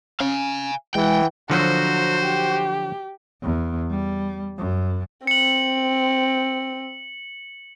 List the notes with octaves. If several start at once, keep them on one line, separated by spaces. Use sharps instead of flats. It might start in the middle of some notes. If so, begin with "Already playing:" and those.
C#4 F5 G#5
E3 G#3 F#5 G5
D3 F3 F#3 F#4 C5 A#5
G4
E2
G3
F#2
C4 C#7 F#7